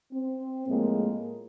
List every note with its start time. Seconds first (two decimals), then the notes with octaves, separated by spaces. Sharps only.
0.12 C4
0.67 A2 F3 G#3 A#3